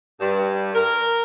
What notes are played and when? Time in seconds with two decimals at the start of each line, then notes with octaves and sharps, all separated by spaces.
0.19 G2
0.72 A#4